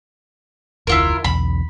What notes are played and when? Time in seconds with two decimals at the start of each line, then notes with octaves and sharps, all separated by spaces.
0.87 F1 D2 E4 F4 A#4
1.24 B1 E2 B5